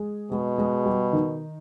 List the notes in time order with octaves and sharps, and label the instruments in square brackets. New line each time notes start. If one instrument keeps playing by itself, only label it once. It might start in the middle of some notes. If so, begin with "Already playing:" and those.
Already playing: [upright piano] G#3 G#4
[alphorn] B2 [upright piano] G#3 G#4
[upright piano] G#3 G#4
G3 G4
D#3 D#4